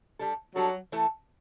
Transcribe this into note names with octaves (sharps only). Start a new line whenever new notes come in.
G3 D4 A4
F#3 G3 D4 A4
E3 A3 E4 A4